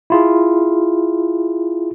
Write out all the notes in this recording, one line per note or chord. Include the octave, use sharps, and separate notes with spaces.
E4 F4 G#4